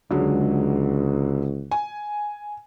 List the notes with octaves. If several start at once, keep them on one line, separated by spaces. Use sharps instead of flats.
C#2 D3 F#3 G#3
G#5